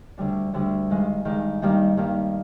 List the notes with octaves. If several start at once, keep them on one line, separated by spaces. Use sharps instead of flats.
D2 D3 G3 D4
D2 D3 G3 D4
G2 D#3 G#3
G2 D#3 G#3
G2 D#3 G3 A#3 D#4
G2 D#3 G3 A#3 D#4